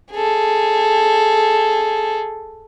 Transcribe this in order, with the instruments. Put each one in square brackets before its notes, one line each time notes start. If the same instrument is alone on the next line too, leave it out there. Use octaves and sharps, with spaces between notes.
[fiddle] G#4 A4